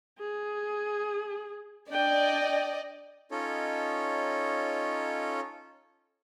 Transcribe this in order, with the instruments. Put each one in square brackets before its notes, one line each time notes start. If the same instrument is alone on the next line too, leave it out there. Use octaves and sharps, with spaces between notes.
[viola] G#4
[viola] D4 G5 [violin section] D5 D#5
[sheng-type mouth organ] C#4 D#4 F4 A4 C#5 D#5